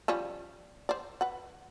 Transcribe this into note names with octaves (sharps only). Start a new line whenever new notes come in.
F3 G3 C#4
C5 D5
B4 F#5